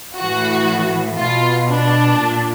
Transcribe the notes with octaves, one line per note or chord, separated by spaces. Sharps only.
A2 E3 F#4
B2 F4
D4
A#2